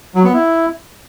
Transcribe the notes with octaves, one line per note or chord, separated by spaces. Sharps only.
F#3
B3
E4